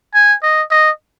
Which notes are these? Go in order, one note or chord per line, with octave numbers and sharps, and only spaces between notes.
G#5
D#5
D#5